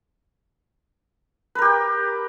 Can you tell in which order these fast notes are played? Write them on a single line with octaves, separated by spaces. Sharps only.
B4 A#4 G4 G5